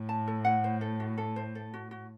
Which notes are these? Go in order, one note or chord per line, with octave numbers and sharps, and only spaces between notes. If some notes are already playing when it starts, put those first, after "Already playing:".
Already playing: A2
A5
A4
F#5
C5
A4
F#4
A4
C5
A4
F#4
F#4